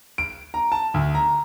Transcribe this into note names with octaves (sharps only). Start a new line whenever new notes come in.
D7
A#5
A5
D2
A#5